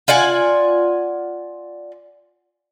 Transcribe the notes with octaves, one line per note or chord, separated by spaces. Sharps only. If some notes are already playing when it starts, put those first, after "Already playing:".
F4 D5 F#5 G#5